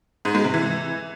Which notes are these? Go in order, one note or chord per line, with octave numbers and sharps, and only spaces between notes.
G#2
G#3
C3
E3